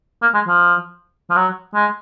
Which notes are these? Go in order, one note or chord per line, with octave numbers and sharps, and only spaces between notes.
A#3
G#3
F3
F3
F#3
G#3